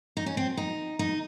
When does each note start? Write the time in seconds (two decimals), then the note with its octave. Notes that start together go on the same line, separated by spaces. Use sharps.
0.17 D#4
0.26 C#4
0.37 C4
0.57 D#4
0.99 D#4